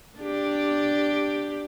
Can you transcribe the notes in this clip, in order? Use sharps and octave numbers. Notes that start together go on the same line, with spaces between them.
D4 G4